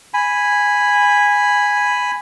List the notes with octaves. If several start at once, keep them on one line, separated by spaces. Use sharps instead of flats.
G#5 B5